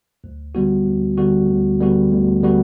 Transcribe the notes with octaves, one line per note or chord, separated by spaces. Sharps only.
D2
D3 G3 B3 F#4
D2
D3 G3 B3 F#4
D2
D3 G3 B3 F#4
D2
D3 G3 B3 F#4